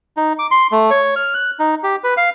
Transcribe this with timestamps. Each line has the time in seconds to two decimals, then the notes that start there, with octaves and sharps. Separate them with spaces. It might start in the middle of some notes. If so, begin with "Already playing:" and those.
0.17 D#4
0.39 D6
0.51 C6
0.72 A3
0.91 C#5
1.16 F6
1.34 F#6
1.59 D#4
1.83 G4
2.04 B4
2.17 F5